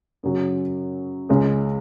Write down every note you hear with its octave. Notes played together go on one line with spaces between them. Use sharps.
F#2 C#3 F#3
C#2 C#3 G#3 C#4 G#4